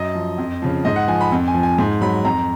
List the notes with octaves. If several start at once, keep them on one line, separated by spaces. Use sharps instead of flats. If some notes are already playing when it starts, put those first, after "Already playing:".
Already playing: F#2 D#5
F3
F2
C#3 F3
G#2 D#5
F#5
F3 G#5
B5
F2
G#5
F3
G#5
G#2
F#3 B5
F2 A#5